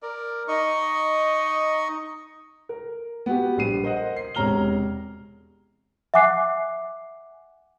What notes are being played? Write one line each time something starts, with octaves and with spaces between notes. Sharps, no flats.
A#4 D5
D#4 D#5 C#6
A#4
B3 F#4 G4
A#1 G3 C7 D#7
A#4 C5 D#5 F#5
C7
E1 C3 C#5 A#5 F6 G7
E5 F#5 G#5 D6 F#6 C7